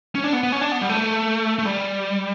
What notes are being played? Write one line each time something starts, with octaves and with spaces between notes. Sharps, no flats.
C#4
D4
B3
B3
C#4
D4
B3
G3
A3
A3
G3